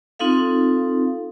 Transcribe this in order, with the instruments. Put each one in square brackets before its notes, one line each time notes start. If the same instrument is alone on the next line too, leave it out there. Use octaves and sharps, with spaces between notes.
[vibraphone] C4 D#4 F4 A4 F5